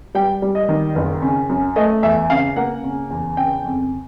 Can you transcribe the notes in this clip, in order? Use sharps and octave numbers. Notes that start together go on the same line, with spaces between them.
G3 G5
G3
D#5
D#3
F#1
C#3
F#2
A3 D#5
E2 E5
C#3 F5
A#3 F#5
C#3
E2
C#3 G5
F2